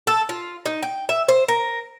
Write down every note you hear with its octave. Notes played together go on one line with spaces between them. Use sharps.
A4
F4
D#4
G5
E5
C5
A#4